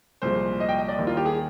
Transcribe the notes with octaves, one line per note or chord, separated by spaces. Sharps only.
C2 A#2 F3 G#3 C5
D#5
G5
D#5
D5
D#2 D#3 G3 A#3
F4
G4
G#4